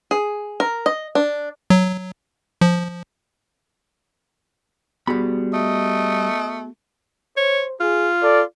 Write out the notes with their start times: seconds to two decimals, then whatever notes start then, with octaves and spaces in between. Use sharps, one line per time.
0.11 G#4
0.60 A#4
0.86 D#5
1.15 D4
1.70 F#3
2.61 F3
5.07 G3 B3 F#4 G#4 B5
5.54 A3 D#5
7.37 C5 C#5
7.80 F4 G#4
8.23 A4 D5